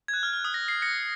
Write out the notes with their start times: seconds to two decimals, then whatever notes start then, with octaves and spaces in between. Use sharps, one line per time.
0.08 G#6
0.13 F#6
0.23 F6
0.34 F6
0.45 D#6
0.54 A#6
0.68 C7
0.82 A#6 C#7